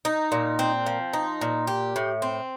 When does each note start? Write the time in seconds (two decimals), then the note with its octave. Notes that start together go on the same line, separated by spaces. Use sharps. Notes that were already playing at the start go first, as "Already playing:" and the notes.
0.05 D#4
0.32 A#2
0.59 C4
0.86 F3
1.13 D#4
1.41 A#2
1.67 G4
1.96 A2
2.22 C4